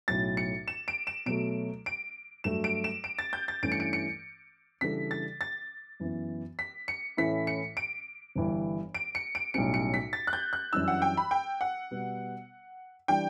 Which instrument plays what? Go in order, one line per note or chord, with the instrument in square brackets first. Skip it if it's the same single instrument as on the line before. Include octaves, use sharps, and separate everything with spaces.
[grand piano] B1 A2 F#3 [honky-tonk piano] A6
[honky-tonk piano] C#7
E7
D7
E7
[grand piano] B2 F#3 A3 [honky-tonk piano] D7
[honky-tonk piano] D7
[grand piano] G2 F#3 A3 [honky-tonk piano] E7
[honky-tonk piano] D7
E7
D7
A6
G6
A6
[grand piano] G2 E3 A3 C#4 E4 [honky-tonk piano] D7
[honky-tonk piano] C#7
D7
C#7
[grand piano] C#3 E3 G3 D4 A4 [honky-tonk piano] B6
[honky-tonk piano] A6
A6
[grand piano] F#2 E3 B3
[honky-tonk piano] B6
C#7
[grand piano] A2 E3 A3 C#4 E4 [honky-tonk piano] B6
[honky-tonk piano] C#7
D7
[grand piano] G1 G2 E3
[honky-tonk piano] D7
C#7
D7
[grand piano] B1 A2 G3 C#4 [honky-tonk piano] C#7
[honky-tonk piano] C#7
B6
A6
F#6
G6
F#6
[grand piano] F#2 E3 G3 D4 [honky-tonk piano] E6
[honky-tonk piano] F#5
G5
B5
G5
F#5
[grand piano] B2 G3 B3
[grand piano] E3 G3 D4 [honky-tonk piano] G5